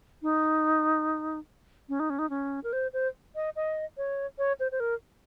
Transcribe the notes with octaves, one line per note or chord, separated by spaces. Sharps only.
D#4
C#4
D#4
C#4
D#4
C#4
A#4
C5
C5
D#5
D#5
C#5
C#5
C5
C5
A#4